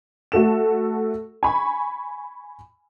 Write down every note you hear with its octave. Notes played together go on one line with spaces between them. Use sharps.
A3 F#4 A4 E7
G#5 B5 C#6